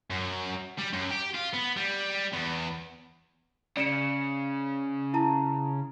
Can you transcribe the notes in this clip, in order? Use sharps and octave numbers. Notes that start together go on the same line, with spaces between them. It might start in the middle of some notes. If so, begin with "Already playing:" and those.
F#2
G3
F#2
G4
F4
B3
G3
E2
C#3 D5 C#7 E7
E4 A5 A#5